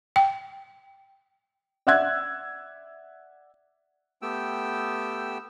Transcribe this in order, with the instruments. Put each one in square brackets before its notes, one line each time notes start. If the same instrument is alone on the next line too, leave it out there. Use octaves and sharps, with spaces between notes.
[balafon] G5
[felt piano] D5 E5 F#5 E6 F#6 G#6
[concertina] A3 B3 G4 G5 E6